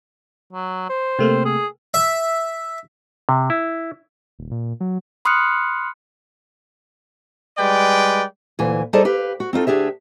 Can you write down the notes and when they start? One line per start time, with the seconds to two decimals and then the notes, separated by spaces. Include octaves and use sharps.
0.53 F#3
0.89 C5
1.19 C3 A3 A#3
1.45 G#4
1.94 E5
3.29 C3
3.50 E4
4.39 D#1
4.51 A#2
4.80 F#3
5.25 B5 C6 D#6 F6 F#6 C#7
7.58 G3 G#3 B4 D5 G5
8.59 D2 A#2 E3 G#5
8.93 G3 D#4 G#4 A4 C5 D5
9.05 G4 B4 F5
9.40 F#4
9.53 C4 D#4 F4 A4
9.67 D2 D4 G4 G#4 E5